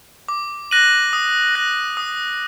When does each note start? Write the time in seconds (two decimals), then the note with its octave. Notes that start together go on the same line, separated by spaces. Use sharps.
0.29 D6
0.71 F#6 A#6 D#7 F#7
1.13 D#6
1.55 F#6 A#6
1.97 D#6